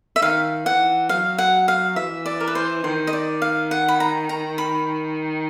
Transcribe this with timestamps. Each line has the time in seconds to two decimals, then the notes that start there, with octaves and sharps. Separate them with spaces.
0.16 E5
0.22 D#3 F5
0.65 E3 F#5
1.09 F#3 F5
1.38 F#5
1.68 F5
1.96 E3 E5
2.26 D5
2.40 A#4
2.47 B4
2.55 C5
2.83 D#3 C5
3.07 D#5
3.13 D5
3.42 F5
3.71 F#5
3.88 B5
4.00 A#5
4.29 A#5
4.58 B5